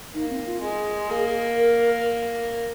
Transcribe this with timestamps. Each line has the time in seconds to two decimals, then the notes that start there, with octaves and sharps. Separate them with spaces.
0.14 A#3 D#4
0.31 C4
0.46 F4
0.62 G#3 G#4
1.10 A#3
1.57 A#4